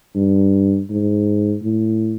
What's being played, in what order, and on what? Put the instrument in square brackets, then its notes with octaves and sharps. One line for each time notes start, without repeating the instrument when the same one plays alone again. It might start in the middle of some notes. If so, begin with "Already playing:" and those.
[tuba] G2
G#2
A2